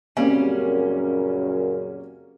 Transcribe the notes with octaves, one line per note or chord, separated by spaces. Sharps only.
F#2 A#2 C#3 G3 A#3 C4 C#4